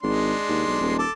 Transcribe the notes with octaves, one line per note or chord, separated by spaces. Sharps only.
G#1 G#3 D4 C6
D#2
B1
D#1
A4 A5 D6